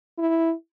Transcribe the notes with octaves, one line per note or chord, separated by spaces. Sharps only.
E4